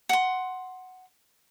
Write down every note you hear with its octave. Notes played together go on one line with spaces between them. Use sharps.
F#5 C6